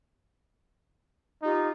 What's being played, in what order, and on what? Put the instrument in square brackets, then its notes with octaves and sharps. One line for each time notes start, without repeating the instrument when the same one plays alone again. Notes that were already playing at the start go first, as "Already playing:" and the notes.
[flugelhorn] D#4 [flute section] F4 G4